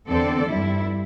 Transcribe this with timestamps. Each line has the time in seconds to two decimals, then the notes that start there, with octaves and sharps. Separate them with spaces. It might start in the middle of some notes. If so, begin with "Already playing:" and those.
0.08 E2 D3 C4 A4 D5
0.50 G2 G3 E4